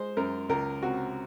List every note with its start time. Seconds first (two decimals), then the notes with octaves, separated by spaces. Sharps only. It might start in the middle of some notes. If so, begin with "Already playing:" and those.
Already playing: G#3 C5
0.17 F#2 A#4
0.49 C#2 A#4
0.82 C3 F#4